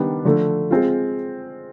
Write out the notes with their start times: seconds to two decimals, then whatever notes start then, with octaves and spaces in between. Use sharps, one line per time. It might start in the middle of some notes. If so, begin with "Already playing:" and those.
Already playing: D#3 G3 B3 D4 G4
0.25 D3 F3 A3
0.71 G#3 C4 F4